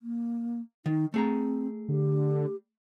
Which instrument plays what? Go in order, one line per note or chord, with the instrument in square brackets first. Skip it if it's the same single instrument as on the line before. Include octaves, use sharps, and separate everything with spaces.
[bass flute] A#3
[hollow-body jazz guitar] D#3 [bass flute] D#4
[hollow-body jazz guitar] A3 G#4 A#5 [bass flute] C4
[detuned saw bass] D3 [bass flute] G4